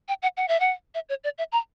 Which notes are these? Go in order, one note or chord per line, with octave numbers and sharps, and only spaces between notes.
G5
F#5
F#5
E5
F#5
E5
C#5
D5
E5
A#5